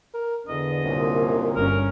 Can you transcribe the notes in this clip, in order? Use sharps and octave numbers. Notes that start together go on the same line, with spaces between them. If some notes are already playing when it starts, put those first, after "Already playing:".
A#4
E2 D3 D#5
C2 F#2 A#2
G1 C#4 A#4